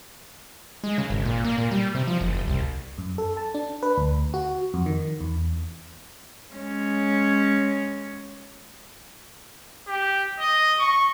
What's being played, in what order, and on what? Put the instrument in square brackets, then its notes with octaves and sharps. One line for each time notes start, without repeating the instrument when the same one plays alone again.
[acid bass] G#3
C#3
G#1
A#2
A#3
A#2
G3
C3
F3
F#1
F#1
C2
[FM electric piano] F#2
A4
A5
D4
B4
D2
F#4
F2
D#3
E2
[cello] G#3 C#4
[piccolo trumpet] G4
D#5
C#6